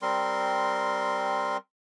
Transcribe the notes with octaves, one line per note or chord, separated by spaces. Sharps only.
G3 C4 A#4 C6